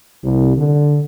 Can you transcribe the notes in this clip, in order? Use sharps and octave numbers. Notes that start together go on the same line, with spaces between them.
C2
D3